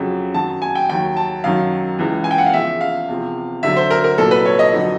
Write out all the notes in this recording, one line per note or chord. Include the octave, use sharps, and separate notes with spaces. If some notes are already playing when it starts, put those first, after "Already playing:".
Already playing: F2 C#3 F#3
F#2 D#3 F#3 A5
G#5
G5
D#2 D#3 F#3 G5
A5
F#2 D#3 F#3 F5
C#2 C#3 E3
G#5
G5
F#5
F5
E2 C#3 F3 E5
F5
E2 C3 F3
D2 D3 F#3 E5
C5
A#4
A#4
C2 A#2 F#3 A4
B4
C#5
D#5
F2 D3 F#3